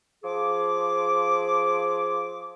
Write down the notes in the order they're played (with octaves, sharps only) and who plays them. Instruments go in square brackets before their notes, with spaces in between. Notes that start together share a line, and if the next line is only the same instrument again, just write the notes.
[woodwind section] F3 G#4 D6